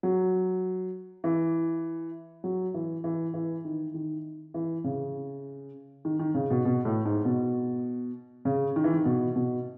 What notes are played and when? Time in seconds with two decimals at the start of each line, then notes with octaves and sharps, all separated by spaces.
0.03 F#3
1.24 E3
2.44 F#3
2.74 E3
3.04 E3
3.34 E3
3.65 D#3
3.94 D#3
4.54 E3
4.84 C#3
6.05 D#3
6.19 D#3
6.34 C#3
6.50 B2
6.65 B2
6.85 A2
7.05 G#2
7.25 B2
8.45 C#3
8.76 D#3
8.84 E3
8.94 D#3
9.05 B2
9.35 B2